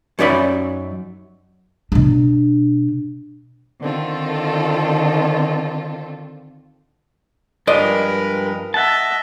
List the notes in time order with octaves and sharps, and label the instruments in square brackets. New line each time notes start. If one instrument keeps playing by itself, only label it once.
[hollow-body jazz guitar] F#2 C#4 D#4 D5 E5 B5
[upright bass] B2 D4
[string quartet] D3 D#3 C4 F4 A4
[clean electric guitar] G2 F3 G#3 [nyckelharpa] A#4 B4 [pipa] D5 D#5
[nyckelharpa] D#5 E5 [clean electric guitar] F#5 A5